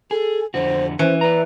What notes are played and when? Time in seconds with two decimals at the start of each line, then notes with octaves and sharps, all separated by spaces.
0.11 G#4 A4
0.54 F2 D3 F#4 C5
0.99 E3 C#4 C5
1.21 B4 D5 A#5